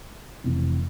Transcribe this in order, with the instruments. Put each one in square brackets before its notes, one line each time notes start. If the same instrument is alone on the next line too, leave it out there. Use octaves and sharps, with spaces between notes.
[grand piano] F1 F2 C3 E3